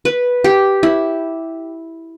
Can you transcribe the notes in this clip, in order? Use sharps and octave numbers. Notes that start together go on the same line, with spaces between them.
B4
G4
E4